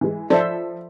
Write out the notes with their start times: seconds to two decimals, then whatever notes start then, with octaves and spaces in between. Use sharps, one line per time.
0.01 E3 G#3
0.30 F3 A4 C5 D5 E5